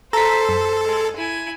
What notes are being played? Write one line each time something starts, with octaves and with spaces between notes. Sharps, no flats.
A4 C5 A#5 B6
F#2
G#3
E4 G#5